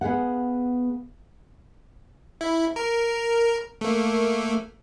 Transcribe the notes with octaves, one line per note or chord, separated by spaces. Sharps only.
B3 G#4 F5 F#5
E4
A#4
A3 A#3